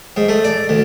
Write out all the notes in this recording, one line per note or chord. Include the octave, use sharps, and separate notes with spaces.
G#2
A3
D5
D2